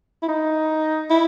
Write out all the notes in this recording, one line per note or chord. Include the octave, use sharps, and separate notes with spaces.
E4
D#4
E4